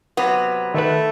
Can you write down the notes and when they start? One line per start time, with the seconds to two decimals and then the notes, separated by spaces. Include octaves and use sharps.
0.17 C3 F#3 B3
0.74 D#3 A3 B4